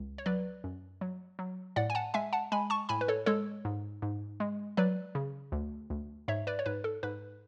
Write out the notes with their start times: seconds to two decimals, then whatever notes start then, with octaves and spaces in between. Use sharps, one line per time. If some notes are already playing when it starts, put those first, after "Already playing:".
Already playing: C#2
0.18 C#5
0.26 F#3 B4 D5
0.64 F#2
1.01 F#3
1.39 F#3
1.76 A2 D5 F#5
1.90 G#5
1.95 F#5 A5
2.14 G#3 E5 G#5
2.33 F#5 A5
2.52 G#3 G#5 B5
2.70 A5 C#6
2.89 A2 G#5 B5
3.01 B4
3.08 A4 C#5
3.26 G#3 A4 C#5
3.65 G#2
4.02 G#2
4.40 G#3
4.77 F#3 B4 D5
5.15 C#3
5.52 D2
5.90 D2
6.28 G#2 C#5 E5
6.47 B4 D5
6.59 C#5
6.66 G#2 B4
6.84 A4
7.03 G#2 B4